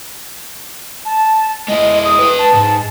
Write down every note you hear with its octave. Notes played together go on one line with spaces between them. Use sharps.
A5
G#3 E4 D#5
D#6
B4 G5
A5
G#2